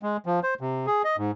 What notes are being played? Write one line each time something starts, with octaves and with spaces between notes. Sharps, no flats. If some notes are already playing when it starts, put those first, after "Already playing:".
G#3
F3
C5
C3
G#4
D#5
G#2